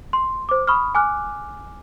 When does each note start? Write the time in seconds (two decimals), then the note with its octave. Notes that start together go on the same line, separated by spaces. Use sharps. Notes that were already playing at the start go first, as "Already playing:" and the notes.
0.13 C6
0.49 C5 D6
0.67 B5 C#6 D#6 F6
0.95 G#5 D6 F6 F#6